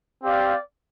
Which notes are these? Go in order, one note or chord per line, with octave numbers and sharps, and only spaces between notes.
C4 G4 D5 F5